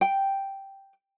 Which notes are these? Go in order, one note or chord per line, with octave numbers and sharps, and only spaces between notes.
G5